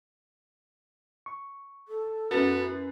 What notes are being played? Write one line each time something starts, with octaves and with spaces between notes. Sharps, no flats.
C#6
A4
F#2 B3 E4 F#4 B4 A6